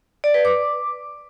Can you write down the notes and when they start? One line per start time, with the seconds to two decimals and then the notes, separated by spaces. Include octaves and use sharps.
0.24 D5
0.34 B4
0.45 D6